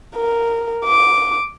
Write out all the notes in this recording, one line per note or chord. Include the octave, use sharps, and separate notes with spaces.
A#4
D6